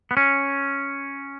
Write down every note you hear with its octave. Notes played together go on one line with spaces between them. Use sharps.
B3
C#4